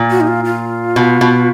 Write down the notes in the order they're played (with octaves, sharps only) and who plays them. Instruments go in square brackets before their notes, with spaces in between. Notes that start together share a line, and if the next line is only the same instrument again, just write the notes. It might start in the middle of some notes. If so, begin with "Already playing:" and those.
Already playing: [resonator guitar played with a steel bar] A#2
[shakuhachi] F#4
D#4
F4
F4
[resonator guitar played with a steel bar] B2
B2